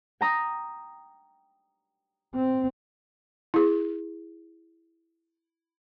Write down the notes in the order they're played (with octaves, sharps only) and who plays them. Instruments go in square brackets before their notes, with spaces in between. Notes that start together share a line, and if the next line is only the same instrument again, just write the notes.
[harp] G5 A#5 D#6
[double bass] C4
[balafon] E4 G#4